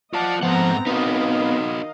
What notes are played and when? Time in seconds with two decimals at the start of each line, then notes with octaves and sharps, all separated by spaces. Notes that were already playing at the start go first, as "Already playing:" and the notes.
0.13 F4 D5 D#5 F#5 A5
0.43 G#2 F3 A3 B3 C4 F#5 A#5
0.86 D#3 B3 C4 D#4 F#4 D#5 F5